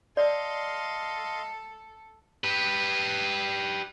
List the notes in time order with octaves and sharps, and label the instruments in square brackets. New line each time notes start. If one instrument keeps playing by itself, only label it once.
[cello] A4 [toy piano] D5 [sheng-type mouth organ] D#5 F5 C6
[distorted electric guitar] G4 B4